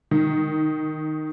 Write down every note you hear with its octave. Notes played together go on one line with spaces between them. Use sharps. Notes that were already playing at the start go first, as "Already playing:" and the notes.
D#3